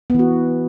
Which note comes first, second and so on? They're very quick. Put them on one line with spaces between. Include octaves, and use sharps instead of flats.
B3 E3 F#4